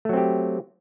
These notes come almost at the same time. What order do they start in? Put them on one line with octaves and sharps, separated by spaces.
A3 F#3 C4 G4